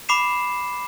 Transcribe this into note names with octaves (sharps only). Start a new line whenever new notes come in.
B5 D6 C7 E7